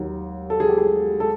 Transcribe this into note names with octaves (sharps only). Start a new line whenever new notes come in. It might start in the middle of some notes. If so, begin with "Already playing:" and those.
Already playing: D#2 D#3 F#3
A4
G#4
G4
G#4
A4